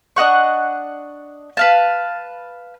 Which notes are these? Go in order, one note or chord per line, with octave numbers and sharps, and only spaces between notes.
D4 D#5 F#5 C#6
B4 F5 A5